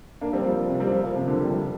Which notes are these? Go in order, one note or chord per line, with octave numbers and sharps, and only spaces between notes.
A#3 D4
G3 C4
F3 A#3
C3
G3 C4
F3 A#3
F3 A#3
C3 F3
D3
D3 G3
F3 A#3